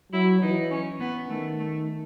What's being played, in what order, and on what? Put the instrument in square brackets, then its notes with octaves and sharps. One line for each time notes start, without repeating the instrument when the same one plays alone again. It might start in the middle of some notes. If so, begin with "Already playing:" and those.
[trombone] F#3 [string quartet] E4
[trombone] E3 [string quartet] D#4
[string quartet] C#4
B3
[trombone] D#3 [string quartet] A3
[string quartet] A3